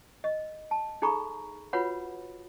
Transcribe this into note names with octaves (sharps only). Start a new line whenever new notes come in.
D#5
A5
D#4 G#4 A4 A#5 B5 C#6
F4 F#4 B4 C#5 F#5 B5